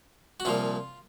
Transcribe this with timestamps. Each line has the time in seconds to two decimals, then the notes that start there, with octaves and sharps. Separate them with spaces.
0.40 F#4
0.45 C2 A#2 F3 F4